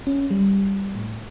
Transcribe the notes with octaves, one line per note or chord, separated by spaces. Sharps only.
C#4
G3
A2